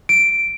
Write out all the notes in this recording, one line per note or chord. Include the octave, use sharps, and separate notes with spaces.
D7